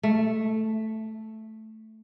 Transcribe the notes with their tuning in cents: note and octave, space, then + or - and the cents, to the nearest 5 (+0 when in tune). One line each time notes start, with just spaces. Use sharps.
A3 +0